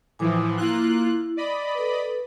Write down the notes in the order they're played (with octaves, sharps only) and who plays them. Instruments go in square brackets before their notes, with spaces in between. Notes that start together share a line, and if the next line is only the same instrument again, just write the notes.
[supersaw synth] A2 E3 F3 [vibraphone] G#5 D6 D#6
[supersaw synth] A#3 F4 F#6 [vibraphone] E4
[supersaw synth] D5 D#5 B5
[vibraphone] A4 B4